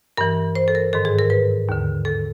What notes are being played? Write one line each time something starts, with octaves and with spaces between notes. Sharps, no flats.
G2 E3 A#4
C5
A4
A#4
G#2 D#3 A4
G#4
A#4
B4
D#2 D3
A4